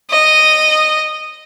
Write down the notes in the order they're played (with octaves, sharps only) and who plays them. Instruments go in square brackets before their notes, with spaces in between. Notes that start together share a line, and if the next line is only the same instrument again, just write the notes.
[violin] D#5